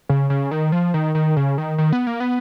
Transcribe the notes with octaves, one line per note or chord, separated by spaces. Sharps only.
C#3
C#3
D#3
F3
D#3
D#3
C#3
D#3
D#3
B3
A#3
B3